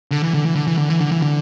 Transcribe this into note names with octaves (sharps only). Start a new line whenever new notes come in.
D3
E3
D3
E3
D3
E3
D3
E3
D3
E3
D3